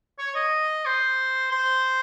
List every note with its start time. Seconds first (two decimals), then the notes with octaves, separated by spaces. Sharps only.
0.19 C#5
0.35 D#5
0.85 C5
1.52 C5